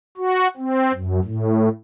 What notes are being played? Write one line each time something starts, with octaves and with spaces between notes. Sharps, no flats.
F#4
C4
F#2
A2